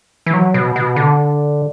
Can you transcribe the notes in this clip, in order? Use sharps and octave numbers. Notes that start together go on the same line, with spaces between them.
E3
F#3
B2
B2
D3